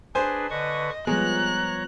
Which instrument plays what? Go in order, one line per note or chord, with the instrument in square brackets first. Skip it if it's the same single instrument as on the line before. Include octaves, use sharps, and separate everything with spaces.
[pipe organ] D4 G#4 B4 [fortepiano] C5 G#5
[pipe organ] D3 B4 C#6 [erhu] D#5
[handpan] F3 G3 B3 [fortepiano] G#3 [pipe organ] C#5 A#5 [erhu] F#6